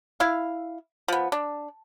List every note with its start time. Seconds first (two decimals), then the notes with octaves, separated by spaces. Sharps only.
0.20 E4 F5
1.08 F3 B3
1.32 D4